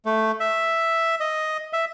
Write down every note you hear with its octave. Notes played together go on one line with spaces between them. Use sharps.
A3
E5
D#5
E5